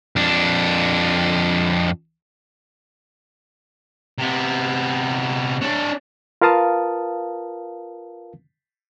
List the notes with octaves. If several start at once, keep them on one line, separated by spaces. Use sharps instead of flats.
F2 D4
C3 B3
D4 C#5
F4 A#4 B4 F5 A5 D#6